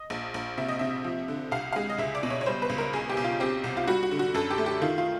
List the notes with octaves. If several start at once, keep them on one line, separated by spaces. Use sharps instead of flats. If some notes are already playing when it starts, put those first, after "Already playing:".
Already playing: D#5
A#1
A#1
C3 E5
D#5
C3 E5
F3
D3
C2 F5
G#3 F5
D#5
C#2 E5
D5
B2
C#5
C#5
G3 C5
B4
C#2
A#4
B1 G#4
G4
B1
F4
C4 G4
C2
F4
G3 F#4
F#4
D3
F#4
F#2 A4
G4
A3
G4
D#3 F4
F4